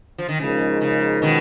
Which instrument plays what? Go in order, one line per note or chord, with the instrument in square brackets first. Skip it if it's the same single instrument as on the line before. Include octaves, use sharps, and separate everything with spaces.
[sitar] F3
D#3
[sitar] C#3 [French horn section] F3 G#3 D#4 A#4
[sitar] C#3
B2 D#3